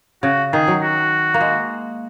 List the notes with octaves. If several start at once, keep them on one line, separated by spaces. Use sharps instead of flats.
C#3 F#4
D#3 G#4
F#3
F#4
A#3
G#3